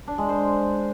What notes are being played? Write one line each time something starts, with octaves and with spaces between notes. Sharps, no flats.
D4
G#3
C5